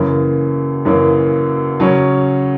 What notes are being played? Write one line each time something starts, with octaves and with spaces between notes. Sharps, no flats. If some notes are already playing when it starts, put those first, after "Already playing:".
Already playing: F#2 C#3 E3 A#3
F#2 C#3 E3 A#3
C#3 F#3 C#4